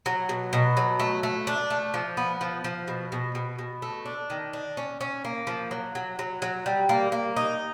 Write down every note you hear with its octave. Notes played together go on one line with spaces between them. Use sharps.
F#3
B2
B2
F#3
A3
A3
D4
A3
F3
B3
F3
F3
B2
B2
B2
B2
A3
D4
D#3
D4
C#4
C#4
A#3
F3
F#3
F#3
F#3
F#3
G3
A#3
A#3
D#4